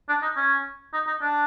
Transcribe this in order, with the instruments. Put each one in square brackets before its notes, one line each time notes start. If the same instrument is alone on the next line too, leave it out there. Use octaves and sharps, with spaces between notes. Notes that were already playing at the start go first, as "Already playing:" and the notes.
[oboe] D4
D#4
C#4
D#4
D#4
D4